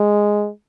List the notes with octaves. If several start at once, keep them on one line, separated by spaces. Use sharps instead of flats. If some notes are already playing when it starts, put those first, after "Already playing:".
Already playing: G#3